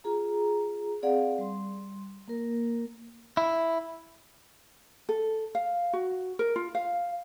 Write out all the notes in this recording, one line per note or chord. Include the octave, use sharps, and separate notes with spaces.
F4 G#4 A#5
C4 G#4 D5 F5 F#5
G3 C6
A#3 A#4
E4
A4
F5
F#4
A#4
F4
F5